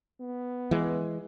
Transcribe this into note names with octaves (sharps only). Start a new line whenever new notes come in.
B3
E3 G#3